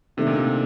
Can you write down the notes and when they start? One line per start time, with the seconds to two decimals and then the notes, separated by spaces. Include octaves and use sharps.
0.17 C3 D#3 A3 D4
0.27 A#2
0.36 C3